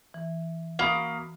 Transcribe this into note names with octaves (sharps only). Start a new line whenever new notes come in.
E3
A#3 F#4 B5 D#6